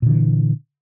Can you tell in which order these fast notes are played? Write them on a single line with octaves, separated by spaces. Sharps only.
A#2 D3 E3